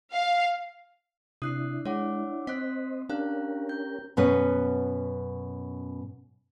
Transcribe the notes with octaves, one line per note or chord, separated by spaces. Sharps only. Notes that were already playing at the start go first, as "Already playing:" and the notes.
F5
C3 D4 E4 D#6 F#6 C7
G#3 C#5 F#5 D6
C4 C5 D#5 F#6 B6
C#4 D4 G4 A#4 F5 F#6
G6
F#2 B2 C#4 B4